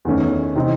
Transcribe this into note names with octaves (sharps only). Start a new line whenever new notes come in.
E2 D#3 A3 C#4
C3 E3 C4 D#4